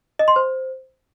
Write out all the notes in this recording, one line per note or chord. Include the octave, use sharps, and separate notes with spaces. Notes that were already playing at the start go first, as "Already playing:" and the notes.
D#5
C6
C5